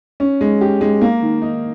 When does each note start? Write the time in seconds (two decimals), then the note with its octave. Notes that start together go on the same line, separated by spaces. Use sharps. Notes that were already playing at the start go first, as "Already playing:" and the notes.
0.20 C#4
0.41 G#3
0.61 G4
0.81 G#3
1.02 A#3
1.22 D#3
1.42 D#4